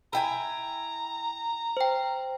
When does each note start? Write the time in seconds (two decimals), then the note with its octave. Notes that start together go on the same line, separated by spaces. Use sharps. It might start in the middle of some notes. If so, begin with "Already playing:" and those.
0.13 E4 G5 G#5 A#5
1.77 C5 G5